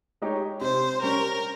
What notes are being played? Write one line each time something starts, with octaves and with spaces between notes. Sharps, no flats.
G#3 D#4 G4 C#5
C3 C5
G3 C#4 A#4